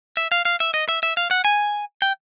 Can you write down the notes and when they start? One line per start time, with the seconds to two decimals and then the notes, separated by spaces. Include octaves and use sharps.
0.17 E5
0.32 F5
0.45 F5
0.60 E5
0.74 D#5
0.89 E5
1.03 E5
1.17 F5
1.31 F#5
1.45 G#5
2.02 G5